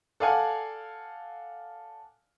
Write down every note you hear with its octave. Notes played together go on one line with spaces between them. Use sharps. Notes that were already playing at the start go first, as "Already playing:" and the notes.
A4 D5 F5 F#5 G#5